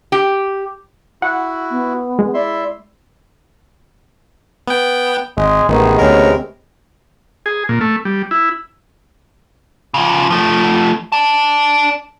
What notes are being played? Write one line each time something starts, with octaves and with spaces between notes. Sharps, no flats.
G4
E4 F#4 F#5
B3
G#3
E4 D5 E5 C6
B3 G5
G#1 G#3
A1 C3 D#3 G#3 B3
D2 C#4 A#4
G#4
A#2
A3
G3
E4
C#3 F3
F3 A3
D5 A5